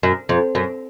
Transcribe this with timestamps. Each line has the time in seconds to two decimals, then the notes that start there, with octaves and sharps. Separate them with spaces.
0.03 F#2
0.29 F2
0.55 F#2